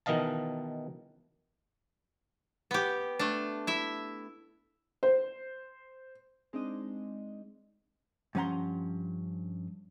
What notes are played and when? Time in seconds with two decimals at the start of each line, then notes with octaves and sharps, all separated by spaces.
0.06 B2 D#3 E3 D#5 F5 A5
2.71 B3 G4
3.19 A3 D4
3.67 E4 E5
5.03 C5
6.53 G#3 C4 D4 D#4 D#5
8.35 G2 F3 C#4 F#5 A#5 C6